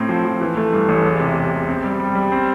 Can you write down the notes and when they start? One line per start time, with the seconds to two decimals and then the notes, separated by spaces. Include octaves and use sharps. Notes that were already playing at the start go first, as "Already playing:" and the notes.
Already playing: A2 C4
0.09 F3
0.25 F3
0.41 E3
0.57 A3
0.73 G2
0.88 A1
1.04 E1
1.20 C3
1.36 E1
1.52 E1
1.68 C4
1.84 G3
2.00 G3
2.15 G3
2.32 C4